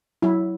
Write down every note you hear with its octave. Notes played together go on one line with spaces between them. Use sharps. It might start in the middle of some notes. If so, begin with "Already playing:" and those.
F#3 E4